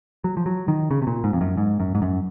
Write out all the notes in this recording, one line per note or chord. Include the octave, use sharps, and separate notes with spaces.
F#3
F3
F#3
D#3
C#3
C3
A#2
G#2
F2
F#2
G#2
F#2
G#2
F#2